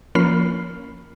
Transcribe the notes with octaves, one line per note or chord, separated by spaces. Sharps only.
F3 A#3 C#4 B5 F6 C7